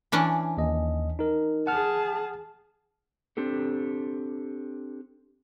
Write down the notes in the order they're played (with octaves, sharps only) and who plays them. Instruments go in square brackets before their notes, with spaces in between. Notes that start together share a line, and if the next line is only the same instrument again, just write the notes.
[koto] E3 C#4 D4
[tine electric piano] D#2 D#5
D#4 A#4
[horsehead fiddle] G#4 A5 [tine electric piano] F#5 F6
[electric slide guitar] C4 D4 G4 A4